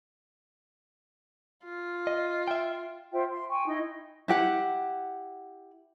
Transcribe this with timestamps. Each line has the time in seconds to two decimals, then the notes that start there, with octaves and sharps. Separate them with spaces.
1.65 F4
2.07 D#5
2.48 E5 G5
3.12 F4 C5 E5 G5
3.29 C6
3.50 G5 G#5 C#6
3.67 D#4 E4 D#5
4.28 E4 G4 F#5